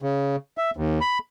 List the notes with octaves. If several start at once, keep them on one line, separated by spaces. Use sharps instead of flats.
C#3
E5
D#2
B5